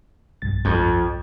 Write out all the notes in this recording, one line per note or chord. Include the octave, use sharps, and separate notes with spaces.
B1 G2 A6
F2